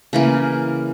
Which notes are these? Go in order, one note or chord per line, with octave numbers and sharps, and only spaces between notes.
C#3 E3 A#3